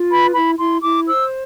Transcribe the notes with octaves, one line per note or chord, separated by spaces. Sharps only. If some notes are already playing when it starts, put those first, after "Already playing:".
Already playing: F4
B4 B5
E4 B5
E4 C6
E4 D6
C5 E6